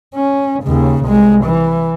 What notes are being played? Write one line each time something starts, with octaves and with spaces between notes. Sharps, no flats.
C#4
D#2 C#3
C2 G#3
E3